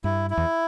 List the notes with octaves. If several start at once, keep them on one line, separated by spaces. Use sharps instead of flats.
G2 E4
E4
E2